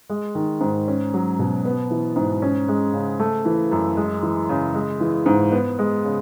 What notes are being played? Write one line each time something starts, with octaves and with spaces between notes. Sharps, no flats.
G#3
D#3
G#2
C#4
F#3
B2
B3
E3
G#2
C#4
G#3
C#3
A3
E3
F#2
G#3
E3
C#3
G#3
E3
G#2
B3
G#3
C#3